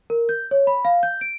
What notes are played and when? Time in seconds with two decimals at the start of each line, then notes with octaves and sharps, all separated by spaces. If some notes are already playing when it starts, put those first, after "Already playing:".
0.10 A#4
0.29 G6
0.51 C#5
0.67 B5
0.85 F5
1.03 G6
1.21 D7